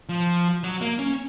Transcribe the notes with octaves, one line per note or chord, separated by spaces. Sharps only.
F3
F#3
A#3
C#4